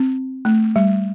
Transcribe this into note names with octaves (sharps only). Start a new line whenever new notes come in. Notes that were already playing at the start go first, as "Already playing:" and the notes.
Already playing: C4
A3
G3